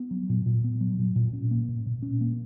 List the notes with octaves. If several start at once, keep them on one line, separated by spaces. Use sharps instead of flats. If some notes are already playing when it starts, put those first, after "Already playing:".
Already playing: B3
F#3
A#2
A#2
B3
F#3
A#2
A#2
C#4
A#3
A#2
A#2
C#4
A#3